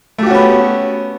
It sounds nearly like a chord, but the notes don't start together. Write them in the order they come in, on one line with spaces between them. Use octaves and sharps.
A3 G4 F#4 C#4 B3